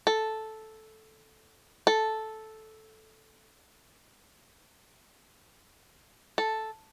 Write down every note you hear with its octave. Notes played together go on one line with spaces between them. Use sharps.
A4
A4
A4